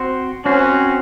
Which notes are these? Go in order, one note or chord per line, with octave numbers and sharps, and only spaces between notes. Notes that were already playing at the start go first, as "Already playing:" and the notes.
Already playing: C4 F#4 C5
C4 C#4 F#4 C5